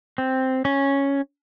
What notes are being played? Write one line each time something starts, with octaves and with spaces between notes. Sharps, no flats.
C4
C#4